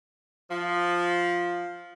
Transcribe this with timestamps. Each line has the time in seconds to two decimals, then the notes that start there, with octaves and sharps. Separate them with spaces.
0.51 F3